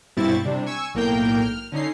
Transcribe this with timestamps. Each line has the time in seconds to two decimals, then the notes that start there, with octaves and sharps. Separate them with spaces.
0.17 G2 B2 C4 E4 C#6 A6
0.45 C3 G3 D4
0.66 G#5 C#6 E6
0.94 B1 A2 A#3 A#4 G5 G6
1.42 F6
1.72 D3 C#4 D#4 C7